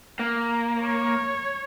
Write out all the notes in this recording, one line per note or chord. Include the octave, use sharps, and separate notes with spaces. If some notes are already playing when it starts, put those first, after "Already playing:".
A#3
C#5